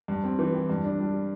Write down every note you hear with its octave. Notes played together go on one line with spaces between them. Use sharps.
G2
C4
E3
G4
G2
D4
G3